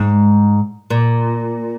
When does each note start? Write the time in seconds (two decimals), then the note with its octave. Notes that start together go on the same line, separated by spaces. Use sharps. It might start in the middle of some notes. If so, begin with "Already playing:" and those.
Already playing: G#2
0.90 A#2